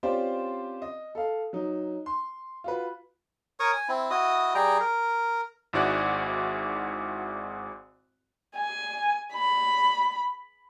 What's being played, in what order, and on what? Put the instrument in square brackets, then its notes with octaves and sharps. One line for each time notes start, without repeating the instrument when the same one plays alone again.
[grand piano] C4 C#4 F4 G4 C5 D5
D#5
A4 F5
F#3 D#4
C6
F4 F#4 B4
[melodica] A#4 C#5 C#6 D#6
G#5
C4 E4
E4 F#4 D#5 D#6
G3 G#4 G5 A#5
A#4
[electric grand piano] G#1 G#2 E4 F#4 D5 F#6
[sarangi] G#5
B5